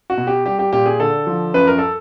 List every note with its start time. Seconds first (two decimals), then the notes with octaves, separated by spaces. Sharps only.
0.10 F#4
0.18 B2
0.27 G4
0.46 G3 G4
0.59 G4
0.73 A#2 G4
0.86 G#4
1.00 D3 A4
1.27 F3
1.54 F#2 B4
1.67 A#4
1.78 A4